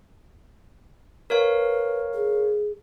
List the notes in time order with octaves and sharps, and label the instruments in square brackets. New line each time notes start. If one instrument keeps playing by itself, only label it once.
[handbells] A#4 C#5 F5 [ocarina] B4
[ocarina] G#4